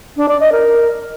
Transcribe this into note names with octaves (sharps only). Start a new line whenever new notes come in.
D4
D5
D#5
A#4